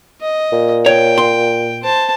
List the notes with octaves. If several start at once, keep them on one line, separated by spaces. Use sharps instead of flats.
D#5
A#2
C#5 G5
C6
C5 A5